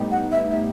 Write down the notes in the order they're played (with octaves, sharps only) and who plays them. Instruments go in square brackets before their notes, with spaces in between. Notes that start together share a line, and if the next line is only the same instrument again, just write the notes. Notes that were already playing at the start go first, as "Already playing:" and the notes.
Already playing: [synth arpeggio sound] A2 G3 B3 D#4 G4
[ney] F#5
E5
E5